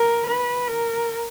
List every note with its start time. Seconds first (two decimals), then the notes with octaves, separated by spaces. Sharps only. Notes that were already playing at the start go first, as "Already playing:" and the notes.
Already playing: A#4
0.27 B4
0.68 A#4